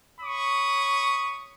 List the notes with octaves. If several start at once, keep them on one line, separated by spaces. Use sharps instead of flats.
C#5 B5 C#6 D#6